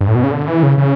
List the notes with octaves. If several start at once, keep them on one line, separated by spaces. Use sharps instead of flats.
G2
A2
B2
C#3
D3
E3
C#3
C#3